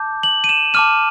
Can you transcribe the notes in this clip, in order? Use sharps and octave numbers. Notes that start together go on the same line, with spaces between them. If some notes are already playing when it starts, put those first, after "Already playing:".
Already playing: A5 D6 G6
F#7
D#7
E7
A5 D6 F6 D#7